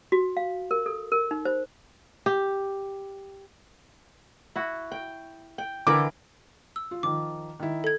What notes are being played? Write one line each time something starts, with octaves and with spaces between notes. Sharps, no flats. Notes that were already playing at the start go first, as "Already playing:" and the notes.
F#4
F5
A#4
A4
A#4
D#4
C5
G4
E4 F#4
G5
G5
D3 E3 E4 A#4 D6
E6
F4
D#3 F3 D6
D#3 E4
A4 G#6